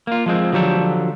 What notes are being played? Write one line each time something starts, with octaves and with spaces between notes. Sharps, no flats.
A#3 F4
F3 G#3 C4
D3 F3 F#3 G4 A4